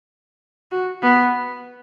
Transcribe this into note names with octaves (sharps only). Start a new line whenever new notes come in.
F#4
B3